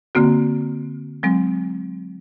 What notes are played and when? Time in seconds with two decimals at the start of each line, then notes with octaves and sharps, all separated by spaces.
0.15 D3 A#3 C4 F#4
1.23 F#3 G#3 C4